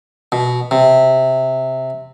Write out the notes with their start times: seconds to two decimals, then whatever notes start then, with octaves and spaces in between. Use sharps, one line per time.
0.32 B2
0.71 C3